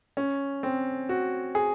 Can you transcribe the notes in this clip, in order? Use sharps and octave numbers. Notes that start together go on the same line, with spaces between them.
C#4
C4
F#4
G#4